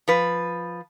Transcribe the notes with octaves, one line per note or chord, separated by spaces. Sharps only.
F3 B4